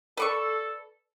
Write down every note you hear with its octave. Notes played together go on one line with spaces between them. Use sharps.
A4 B4 D5 C#6